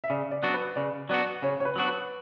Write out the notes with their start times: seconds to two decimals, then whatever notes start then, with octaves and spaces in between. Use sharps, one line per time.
0.04 E5
0.10 C#3 D5
0.31 D5
0.43 F#3 B3 D4 F#4
0.54 B4
0.76 C#3 D5
1.09 F#3 B3 D4 F#4 D5
1.42 C#3 C#5
1.60 C#5
1.65 B4
1.76 F#3 B3 D4 F#4
1.88 B4